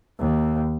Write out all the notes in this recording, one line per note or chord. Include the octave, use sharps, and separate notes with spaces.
D#2